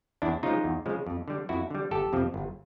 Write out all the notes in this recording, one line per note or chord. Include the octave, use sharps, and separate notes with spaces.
E2 D4 E4
C#3 F3 G#3 D#4 F4
E2
C#3 F3 G#3
F2
D3 G3
F2 E4 F#4
D3 G3
G1 G4 A4
F2 C3 F3
G1